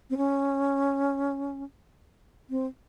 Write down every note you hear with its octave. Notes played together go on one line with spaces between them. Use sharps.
C4
C#4
C4